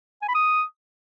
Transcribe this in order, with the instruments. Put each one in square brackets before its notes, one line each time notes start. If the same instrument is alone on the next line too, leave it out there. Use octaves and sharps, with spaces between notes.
[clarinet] G#5
B5
D#6